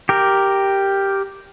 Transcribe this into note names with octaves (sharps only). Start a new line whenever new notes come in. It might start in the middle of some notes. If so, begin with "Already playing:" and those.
G4 A#4